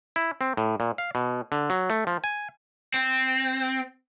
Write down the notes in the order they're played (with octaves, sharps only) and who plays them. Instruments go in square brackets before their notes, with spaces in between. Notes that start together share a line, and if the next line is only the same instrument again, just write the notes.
[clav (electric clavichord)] E4
C4
A2
A#2
F5
B2
D3
F#3
A3
F3
G#5
[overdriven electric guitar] C4